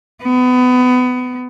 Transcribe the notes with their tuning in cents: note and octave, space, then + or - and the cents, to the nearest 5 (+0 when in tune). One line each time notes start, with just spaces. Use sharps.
B3 +25